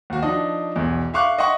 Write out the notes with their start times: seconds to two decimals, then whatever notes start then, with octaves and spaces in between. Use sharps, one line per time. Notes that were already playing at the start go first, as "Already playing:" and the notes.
0.10 D#2 F#4
0.22 F3 D4 D#4 D#5
0.76 B1 E2
1.14 E5 F5 C#6 D6 F#6
1.38 D#5 E5 F#5 C#6